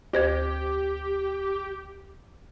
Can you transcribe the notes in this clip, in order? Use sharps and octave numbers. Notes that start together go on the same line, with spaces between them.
D2 G4 C5 G#6